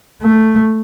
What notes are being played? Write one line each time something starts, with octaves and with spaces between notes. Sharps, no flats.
A3